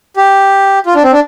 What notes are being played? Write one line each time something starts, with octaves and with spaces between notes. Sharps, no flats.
G4
F4
D4
C4
D4